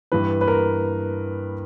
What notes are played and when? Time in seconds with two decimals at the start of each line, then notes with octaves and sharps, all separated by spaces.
0.12 G2 E3 B4
0.41 B4
0.48 A#4